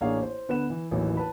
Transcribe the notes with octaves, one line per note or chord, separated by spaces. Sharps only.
A1 A#3 D4 G#4 C#5 F5
C5
D3 B3 B4 F#5 E7
E3
A1 D#2 E3 F#3
B4 A5 B5